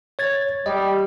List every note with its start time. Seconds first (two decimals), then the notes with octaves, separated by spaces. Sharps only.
0.19 C#5 G#6 A6
0.66 G3 D#5